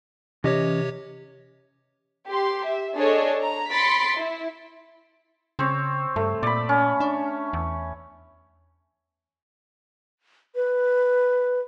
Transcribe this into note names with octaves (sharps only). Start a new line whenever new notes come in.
C3 E3 C#4 G4 C#5 D#5
G4 C6
E5
D4 G#4 A4 C#5 D#5
A#5
B5 C6 A6 B6 C#7 D7
E4
C#3 C4 C#5
G2 A3
A#2 D5 B5
C#4
D4
E2
B4